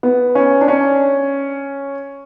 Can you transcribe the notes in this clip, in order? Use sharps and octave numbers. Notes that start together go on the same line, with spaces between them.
B3
C#4
D4
C#4